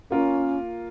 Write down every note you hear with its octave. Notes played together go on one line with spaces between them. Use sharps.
A#3 C#4 F4 A#4